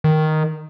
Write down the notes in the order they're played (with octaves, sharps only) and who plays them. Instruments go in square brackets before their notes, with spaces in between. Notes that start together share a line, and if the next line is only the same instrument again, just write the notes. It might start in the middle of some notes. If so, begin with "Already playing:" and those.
[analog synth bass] D#3